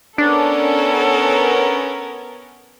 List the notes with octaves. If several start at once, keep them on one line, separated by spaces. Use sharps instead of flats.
B3 C#4 D4 A4 A#4